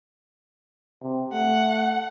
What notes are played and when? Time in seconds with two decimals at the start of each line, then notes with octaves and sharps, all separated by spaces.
1.03 C3
1.33 A3 F#5